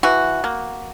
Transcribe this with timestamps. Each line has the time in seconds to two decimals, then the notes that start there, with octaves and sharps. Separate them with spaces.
0.03 E3 F#4
0.44 A#3